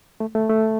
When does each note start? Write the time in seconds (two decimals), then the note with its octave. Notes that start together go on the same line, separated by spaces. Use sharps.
0.20 A3
0.35 A3
0.49 A3